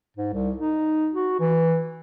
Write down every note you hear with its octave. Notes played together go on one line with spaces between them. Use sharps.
G#2
C2
D#4
F#4
E3